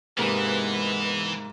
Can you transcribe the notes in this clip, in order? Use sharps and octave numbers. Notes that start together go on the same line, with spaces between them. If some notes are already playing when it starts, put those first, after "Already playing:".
G#2 C3 E3 G#3 A#3 B3